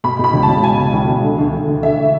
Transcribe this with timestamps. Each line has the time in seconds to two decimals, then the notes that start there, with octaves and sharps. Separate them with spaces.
0.04 B2 B5
0.19 B2 B5
0.33 C#2
0.43 A5
0.48 B2
0.63 B2 G#5
0.78 B2
0.93 C#2
1.08 B2
1.23 D3
1.38 D2
1.53 D2
1.67 D2
1.83 D3 E5